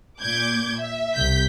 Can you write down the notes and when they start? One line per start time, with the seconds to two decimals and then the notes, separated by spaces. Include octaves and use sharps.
0.21 A#2 D6 G6 G#6
0.77 E5
1.14 C2 G6 B6